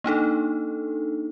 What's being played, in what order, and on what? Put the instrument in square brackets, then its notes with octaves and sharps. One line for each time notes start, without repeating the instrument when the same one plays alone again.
[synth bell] A#3 D4 D#4 A4